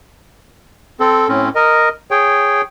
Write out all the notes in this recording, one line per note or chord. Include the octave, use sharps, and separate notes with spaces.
C4 A4
A2 C4 C#4
A#4 D#5
G#4 C#5 G5